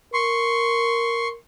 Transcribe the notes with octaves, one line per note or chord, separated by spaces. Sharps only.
A#4 C6 C#6